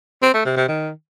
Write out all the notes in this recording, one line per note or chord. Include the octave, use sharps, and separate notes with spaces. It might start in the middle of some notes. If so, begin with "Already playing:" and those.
C4
A3
C3
C3
D#3